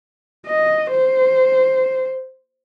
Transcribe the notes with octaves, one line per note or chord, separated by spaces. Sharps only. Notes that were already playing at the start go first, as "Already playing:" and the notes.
D#5
C5